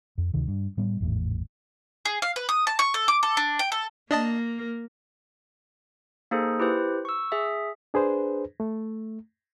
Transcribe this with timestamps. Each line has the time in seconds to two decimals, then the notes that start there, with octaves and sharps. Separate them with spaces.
0.18 F2
0.34 D2 C3 D#3
0.48 G2
0.77 A2 G3 B3
1.01 G#1 E2 A2
2.05 G#4
2.22 F5
2.36 B4
2.49 D#6
2.67 A5
2.79 C#6
2.94 A4
3.08 D6
3.23 A4
3.37 D4
3.59 G5
3.72 A4
4.11 A#3 D4 A#4 D#5 A5
6.31 A#3 D#4 G#4 A4 C5
6.60 E4 G4 B4 C5
7.05 C#6 E6
7.32 G#4 E5
7.94 D4 G#4 B4 C5
8.60 A3